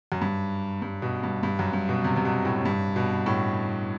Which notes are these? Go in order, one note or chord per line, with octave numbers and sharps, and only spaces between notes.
F#2
G2
G2
B2
G2
G2
F#2
G2
B2
C3
C3
B2
A2
G2
B2
A2